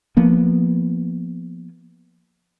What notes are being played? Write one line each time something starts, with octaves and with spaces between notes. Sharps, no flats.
F3 A#3 B3